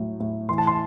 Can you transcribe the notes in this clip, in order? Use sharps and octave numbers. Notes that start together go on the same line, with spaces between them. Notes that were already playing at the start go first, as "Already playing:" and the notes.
Already playing: A2 F#3
A2
E3 C6
A5
C6